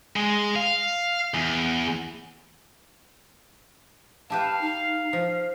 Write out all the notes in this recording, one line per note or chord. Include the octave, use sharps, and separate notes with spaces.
G#3
F5
E2
E4 G4 B4 F5 A5
D#4
F3